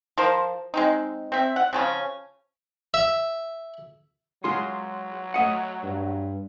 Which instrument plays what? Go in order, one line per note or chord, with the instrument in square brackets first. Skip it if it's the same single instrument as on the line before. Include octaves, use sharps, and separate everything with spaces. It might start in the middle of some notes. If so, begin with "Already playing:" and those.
[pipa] F3 A#4 C5
G#3 C4 D#4
C4 E5
F#5
C#3 F3 C#4
[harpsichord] E5
[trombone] F#3 [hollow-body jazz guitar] G#3 F4 G#4 [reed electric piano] C6
[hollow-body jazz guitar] A3 D#5 F#5
[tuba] G2